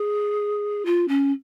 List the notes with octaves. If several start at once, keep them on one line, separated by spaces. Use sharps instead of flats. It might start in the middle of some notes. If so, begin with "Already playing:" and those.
Already playing: G#4
F4
C#4